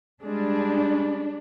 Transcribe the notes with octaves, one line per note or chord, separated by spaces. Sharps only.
G3 G#3 D4